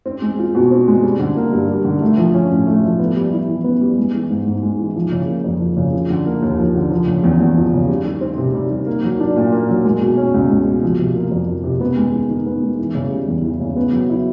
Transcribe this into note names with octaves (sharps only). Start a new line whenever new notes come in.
C4
G#3
F4
B2
C4
G#3
G3
D3
A#3
G2
G3
D3
A3
F3
C#4
A2
A3
F3
B3
G3
E4
E3
B3
G3
G#3
E3
G#2
G#2
G#3
E3
F3
C#3
A#3
F2
F3
C#3
F3
D3
A#3
D#2
F3
D3
F3
C#3
E2
E2
F3
C#3
G3
D#3
C4
C3
G3
D#3
A#3
F#3
D4
A#2
A#3
F#3
G#3
B2
C#4
C#2
G#3
B2
F3
C3
A#3
F2
F3
C3
B3
G#3
D#3
D#3
B3
G#3
E3
C#3
G3
E2
E3
C#3
B3
F#3
E4